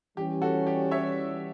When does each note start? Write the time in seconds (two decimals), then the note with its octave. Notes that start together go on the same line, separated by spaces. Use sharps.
0.17 E3 G3 C#4 G4
0.42 F#4 A4
0.67 G4
0.91 C#5 E5